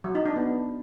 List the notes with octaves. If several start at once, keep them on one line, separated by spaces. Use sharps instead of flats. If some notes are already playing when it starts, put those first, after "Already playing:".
F#3
D#4
D4
B3